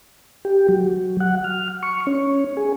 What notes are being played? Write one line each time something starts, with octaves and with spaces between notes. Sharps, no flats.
G4
F#3
F#5
F6
C#6
C#4
G#4